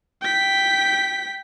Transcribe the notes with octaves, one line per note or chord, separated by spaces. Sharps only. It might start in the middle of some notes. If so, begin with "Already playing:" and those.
G5 B6